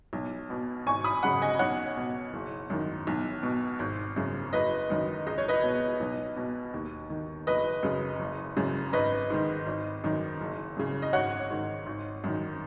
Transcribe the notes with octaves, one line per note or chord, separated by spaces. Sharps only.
B1
B2
G#1 G#5 C#6
B5 D#6
F#2 C#3 F#5 B5
D#5 G#5
B1 C#5 F#5
B2
F#1
F#2 D#3
B1
B2
G#1
F#2 C#3
F#1 B4 D#5
F#2 D#3
C#2 D#5
C#5
B4 D#5
B2
B1
B2
D#2
D#3
F#1 B4 D#5
F#2 C#3
F#1
F#2 C#3
G#1 B4 D#5
G#2 D#3
G#1
F#2 D#3
F#1
F#2 C#3
D#5
G#1 C#5 F#5
G#2 D#3
G#1
F#2 D#3